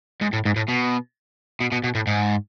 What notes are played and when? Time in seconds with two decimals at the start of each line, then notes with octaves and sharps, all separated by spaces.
0.22 G#2
0.33 A2
0.45 G#2
0.56 A2
0.68 B2
1.60 B2
1.72 B2
1.84 B2
1.95 A2
2.07 G#2